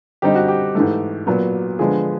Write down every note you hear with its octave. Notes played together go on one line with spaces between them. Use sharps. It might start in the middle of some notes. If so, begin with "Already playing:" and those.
D3 G3 C4 D#4 G4
F#4
G4
G#2 E3 A3
A#2 F#3 B3
D3 F3 G#3 B3 G#4